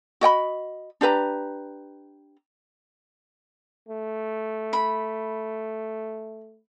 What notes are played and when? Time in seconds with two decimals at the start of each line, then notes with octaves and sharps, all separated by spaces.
0.21 F#4 D#5 G5 B5
1.01 D4 G4 B4 A#5
3.89 A3
4.73 B5